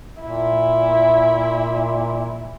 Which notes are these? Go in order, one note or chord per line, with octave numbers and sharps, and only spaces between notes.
A#2 E4